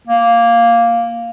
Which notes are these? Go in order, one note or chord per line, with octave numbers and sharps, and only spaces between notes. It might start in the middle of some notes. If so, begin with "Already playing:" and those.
A#3